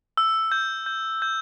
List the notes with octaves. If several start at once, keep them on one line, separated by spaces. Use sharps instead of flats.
E6
G6
G6
G6